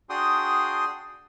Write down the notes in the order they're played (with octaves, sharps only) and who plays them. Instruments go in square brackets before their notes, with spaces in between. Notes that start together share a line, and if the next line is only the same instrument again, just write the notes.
[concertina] D4 F#4 G#4 G5 C6 D#6